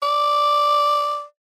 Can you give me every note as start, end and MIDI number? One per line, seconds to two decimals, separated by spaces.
0.02 1.23 74